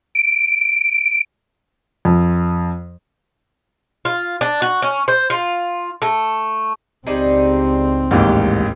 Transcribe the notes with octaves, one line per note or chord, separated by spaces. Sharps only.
D7
F2
F4
D4
F#4
C#4
C5
F4
A3
C#2 G3 C4 D#4 G#4
A1 D#2 G#2 G4